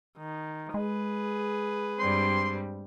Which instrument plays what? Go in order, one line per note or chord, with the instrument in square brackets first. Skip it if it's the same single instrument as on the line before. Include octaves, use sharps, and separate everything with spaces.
[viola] D#3
[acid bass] G#3 [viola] G#4 B4
[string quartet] G2 G3 C4 [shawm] C6